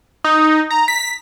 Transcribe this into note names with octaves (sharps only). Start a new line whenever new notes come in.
D#4
A#5
B6